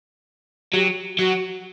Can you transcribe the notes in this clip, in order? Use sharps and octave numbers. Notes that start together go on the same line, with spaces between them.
F#3 G4
F#3 F#4